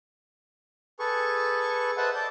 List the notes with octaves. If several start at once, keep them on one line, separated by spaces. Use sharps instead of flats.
G#4 A4 B4 C#6
B4 C5 D#5 E5 F#5 A5
D5 A5 G6